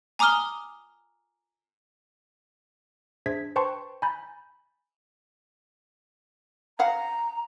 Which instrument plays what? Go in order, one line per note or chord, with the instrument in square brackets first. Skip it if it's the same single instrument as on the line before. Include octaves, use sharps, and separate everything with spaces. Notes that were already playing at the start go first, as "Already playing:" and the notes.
[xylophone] G#5 A#5 D6 D#6 F6 G7
[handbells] D4 G#4 C5 E5 G#6 B6
B4 C5 G5 A5 C6 C#6
G#5 A#5 B5 G6 A6
[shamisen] C#4 F5 F#5 [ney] A#5